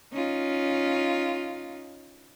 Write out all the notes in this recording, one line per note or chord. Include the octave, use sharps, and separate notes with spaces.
C#4 D#4 F4